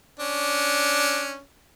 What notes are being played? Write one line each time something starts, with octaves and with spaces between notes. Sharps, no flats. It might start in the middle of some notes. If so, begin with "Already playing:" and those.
C#4 D4